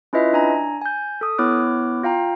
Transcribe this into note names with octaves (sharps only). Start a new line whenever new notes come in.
C#4 E4 F4 B4 D#5 E5
D4 G#5 A#5
G#5 G6
A4 D#6
B3 E4 C#5 D6 F6 F#6
F4 F5 G5 A#5